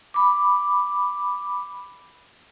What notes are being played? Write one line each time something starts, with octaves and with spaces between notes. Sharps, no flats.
B5 D6